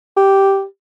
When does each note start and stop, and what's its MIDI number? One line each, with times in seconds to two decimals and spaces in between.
0.17 0.64 67